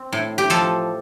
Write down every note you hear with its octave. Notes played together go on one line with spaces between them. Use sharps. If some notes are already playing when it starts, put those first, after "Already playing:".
Already playing: C4
A2
G4
F3 A4